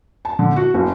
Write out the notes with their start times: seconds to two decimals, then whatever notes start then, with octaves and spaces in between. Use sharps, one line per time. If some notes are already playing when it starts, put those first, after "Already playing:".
0.25 A5
0.39 D3
0.56 F#4
0.74 F#1